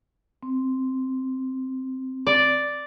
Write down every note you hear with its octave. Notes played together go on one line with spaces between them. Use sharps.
C4
D5